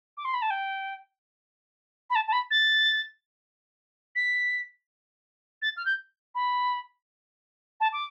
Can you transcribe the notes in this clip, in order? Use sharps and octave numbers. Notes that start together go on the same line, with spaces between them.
D6
C6
B5
A5
G5
B5
A5
A5
B5
A6
B6
A6
F6
G6
B5
A5
D6